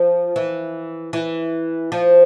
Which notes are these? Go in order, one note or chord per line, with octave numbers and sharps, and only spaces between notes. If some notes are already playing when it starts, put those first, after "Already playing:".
Already playing: F3
E3
E3
F3